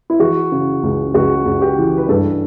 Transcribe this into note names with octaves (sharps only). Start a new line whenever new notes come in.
E4
E3 F#4
C#3
C#2
C#2 F#4
C#2
G4
E3
B4
G2 A4